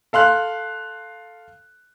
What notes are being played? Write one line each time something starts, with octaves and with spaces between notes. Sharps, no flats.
A4 F5 C6 F#6